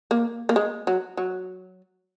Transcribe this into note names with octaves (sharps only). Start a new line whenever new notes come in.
A#3
A#3
G#3
F#3
F#3